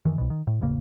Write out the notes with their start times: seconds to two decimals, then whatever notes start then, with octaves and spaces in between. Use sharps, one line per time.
0.05 F#2 D#3 E3
0.18 C2 B2
0.30 D#3
0.47 A2
0.61 E1 A1 C#3 A#3